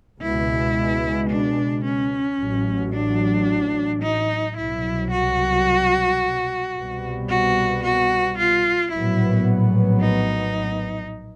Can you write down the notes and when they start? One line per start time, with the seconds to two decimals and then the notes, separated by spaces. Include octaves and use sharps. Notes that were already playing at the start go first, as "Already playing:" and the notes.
0.21 C#2 B2 G#3 E4
1.30 D4
1.85 C#4
2.39 A1 A2 F#3
2.93 D4
4.02 D#4
4.57 C2 B2 F#3 E4
5.11 F#4
6.75 C2 B2 G3 B3
7.29 F#4
7.83 F#4
8.38 F4
8.92 A#1 A2 F#3 B3 E4
10.01 D#4